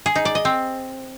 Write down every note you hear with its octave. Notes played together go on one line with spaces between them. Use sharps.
G#4
D#4
D5
D#5
C4